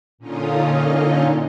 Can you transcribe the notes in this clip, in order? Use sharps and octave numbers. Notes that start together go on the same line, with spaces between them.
A#2 D3 C#4 D#4 F4 D#5